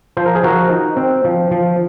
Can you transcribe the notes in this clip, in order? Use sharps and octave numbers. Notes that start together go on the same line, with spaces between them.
F3 C5
A#4
G#4
F3 F#4 A#4
D#4
C4
F3
F3